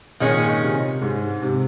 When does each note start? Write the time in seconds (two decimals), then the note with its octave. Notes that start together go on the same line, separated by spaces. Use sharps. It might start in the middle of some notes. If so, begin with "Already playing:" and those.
0.20 A#2 D#3 G#3 C#4
0.61 C3
1.02 G#2
1.42 C3